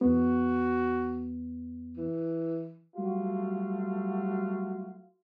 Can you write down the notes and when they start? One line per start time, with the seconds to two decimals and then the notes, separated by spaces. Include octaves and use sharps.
0.01 E2 B3 F#4
1.97 E3
2.96 F#3 G3 A3 F4 F#4